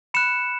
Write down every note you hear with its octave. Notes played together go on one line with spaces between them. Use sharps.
B5 F#6 C#7 E7